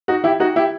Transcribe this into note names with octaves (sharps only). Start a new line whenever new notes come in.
D#4 F#4
E4 G4
D#4 F#4
E4 G4